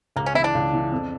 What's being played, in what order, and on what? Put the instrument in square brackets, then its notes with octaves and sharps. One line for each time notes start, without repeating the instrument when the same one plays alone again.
[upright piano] C#2 [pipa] A#3
[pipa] C#4
[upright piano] E3 [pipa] E4
[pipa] D4
[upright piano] C#2
E3
F2